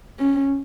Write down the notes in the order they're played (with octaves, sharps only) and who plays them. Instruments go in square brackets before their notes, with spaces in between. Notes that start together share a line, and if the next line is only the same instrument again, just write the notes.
[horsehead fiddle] C#4